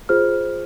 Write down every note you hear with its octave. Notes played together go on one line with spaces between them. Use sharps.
F4 G#4 C5 F6